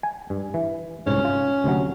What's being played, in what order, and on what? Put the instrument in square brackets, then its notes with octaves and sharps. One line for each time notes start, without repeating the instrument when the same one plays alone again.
[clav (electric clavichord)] G#5
G2
E3
[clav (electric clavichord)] C2 G#2 [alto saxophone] C#4
[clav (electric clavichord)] F4
D2 C3 F#3